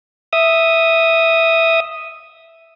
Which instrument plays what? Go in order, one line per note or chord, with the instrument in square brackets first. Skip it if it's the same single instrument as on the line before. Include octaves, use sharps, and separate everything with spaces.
[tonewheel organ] E5 D#6